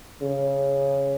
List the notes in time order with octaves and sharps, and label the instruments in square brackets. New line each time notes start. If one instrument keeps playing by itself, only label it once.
[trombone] C#3